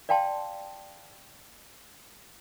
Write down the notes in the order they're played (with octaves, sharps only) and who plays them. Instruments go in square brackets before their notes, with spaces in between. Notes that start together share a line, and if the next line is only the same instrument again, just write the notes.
[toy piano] D5 F5 G5 A5 C6